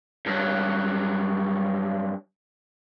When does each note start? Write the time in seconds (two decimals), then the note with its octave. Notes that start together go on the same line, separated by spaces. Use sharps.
0.26 G2 F#3